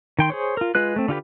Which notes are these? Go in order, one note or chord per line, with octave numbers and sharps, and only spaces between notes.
D#3 G5 C6
G#4 C5 C#5
F4 A#4
G#3 F4 B4 F#6
A3 C4
D3 F4 G4 B4